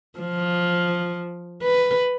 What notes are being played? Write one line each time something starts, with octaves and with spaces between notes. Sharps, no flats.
F3
B4